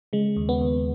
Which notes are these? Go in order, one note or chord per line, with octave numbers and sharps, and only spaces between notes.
C#3 G#3
D#2
B3
D#2